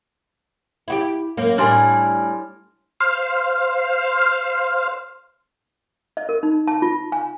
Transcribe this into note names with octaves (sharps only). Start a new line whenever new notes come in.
E4 F#4 G4
F#2 A#3
A2 G3 D4 G#5 C6 F6
C5 F5
D#5
A#4
D#4
A5
F4
G#5